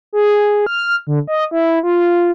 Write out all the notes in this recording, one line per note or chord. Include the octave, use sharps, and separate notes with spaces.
G#4
F6
D3
D#5
E4
F4